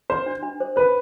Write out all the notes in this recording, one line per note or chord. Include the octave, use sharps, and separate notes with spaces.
B4 C5
D4
D4
C5
B4 C5